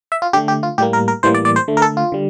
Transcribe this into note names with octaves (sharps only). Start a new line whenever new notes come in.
E5
F4
D3 A3 G4
G4
F4
A2 G3 A#3 G4
A#4
A#4
A2 E3 G3 A#3 C5
D5
D5
C5
D3 A3
A#4
A4
F4
D3 G3